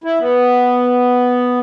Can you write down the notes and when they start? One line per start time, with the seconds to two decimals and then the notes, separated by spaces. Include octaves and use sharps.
0.04 E4
0.20 B3